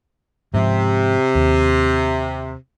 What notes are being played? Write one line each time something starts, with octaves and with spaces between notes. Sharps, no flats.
G#2 C3 F3
D#2